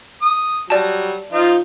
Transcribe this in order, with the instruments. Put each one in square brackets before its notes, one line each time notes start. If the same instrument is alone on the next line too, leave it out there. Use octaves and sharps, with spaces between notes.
[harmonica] D#6
[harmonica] F#3 G3 [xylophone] D5 A5
[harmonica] F3 D#4 F4